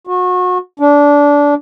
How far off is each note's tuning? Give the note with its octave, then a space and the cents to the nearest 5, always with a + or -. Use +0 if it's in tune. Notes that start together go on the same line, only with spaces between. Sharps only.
F#4 -30
D4 -20